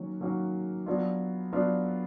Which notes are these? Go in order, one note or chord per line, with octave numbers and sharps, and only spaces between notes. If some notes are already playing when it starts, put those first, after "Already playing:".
Already playing: D#3 F#3 A#3 C#4 F#4
D#3 F#3 A#3 C#4 F#4
F#3 B3 D4 F4
F#3 B3 D4 F4